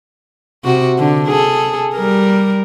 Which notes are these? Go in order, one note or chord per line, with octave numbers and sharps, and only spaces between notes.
C3 F#4
D3
G#4 A4
G3 A#4